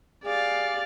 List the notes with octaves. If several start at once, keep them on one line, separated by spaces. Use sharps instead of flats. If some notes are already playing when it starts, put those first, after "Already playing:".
G4 G#4 D5 F5